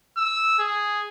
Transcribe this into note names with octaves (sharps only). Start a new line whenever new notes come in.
E6
G#4